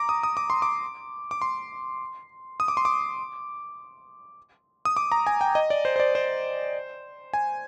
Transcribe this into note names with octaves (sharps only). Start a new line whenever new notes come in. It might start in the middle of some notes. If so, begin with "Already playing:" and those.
Already playing: A#5 D6
D#6
D#6
D6
C6
D6
D6
C6
D#6
D6
C6
D6
D#6
D6
A#5
G#5
G5
D#5
D5
C5
C5
D5
C5
G#5